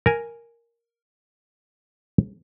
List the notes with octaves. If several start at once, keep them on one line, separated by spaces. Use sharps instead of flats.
A#4 G#5